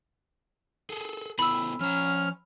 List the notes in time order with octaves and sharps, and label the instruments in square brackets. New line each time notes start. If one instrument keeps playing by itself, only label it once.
[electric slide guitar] G#4 A4
[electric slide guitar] B3 E4 A4 [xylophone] B5 E6
[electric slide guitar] F3 A#5 [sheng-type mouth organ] C#4 F6